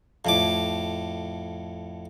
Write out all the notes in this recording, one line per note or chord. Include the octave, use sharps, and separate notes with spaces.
F2 A2 D6